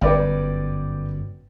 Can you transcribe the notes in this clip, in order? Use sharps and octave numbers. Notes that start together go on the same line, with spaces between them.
G1 F#2 B4 D5 G5